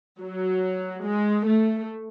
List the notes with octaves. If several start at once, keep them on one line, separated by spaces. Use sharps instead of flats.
F#3
G#3
A3